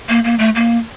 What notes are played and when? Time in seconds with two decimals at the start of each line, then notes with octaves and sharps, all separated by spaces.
0.09 A#3
0.24 A#3
0.39 A3
0.55 A#3